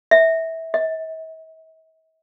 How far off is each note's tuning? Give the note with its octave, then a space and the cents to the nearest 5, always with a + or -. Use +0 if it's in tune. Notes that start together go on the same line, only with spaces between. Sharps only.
E5 -20
E5 -45